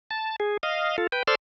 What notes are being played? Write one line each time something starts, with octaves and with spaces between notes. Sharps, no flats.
A5
G#4
D#5 F5
F4 A4
B4 G5
A4 C5 D5 C6 E6 F6